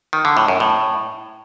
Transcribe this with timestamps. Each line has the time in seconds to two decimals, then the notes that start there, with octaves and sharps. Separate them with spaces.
0.13 D#3
0.25 D3
0.37 A2
0.48 F#2
0.60 A2